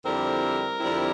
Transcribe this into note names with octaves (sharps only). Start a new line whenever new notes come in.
F2 D3 G3 C4 E4 A#4
F2 D3 G3 C4 E4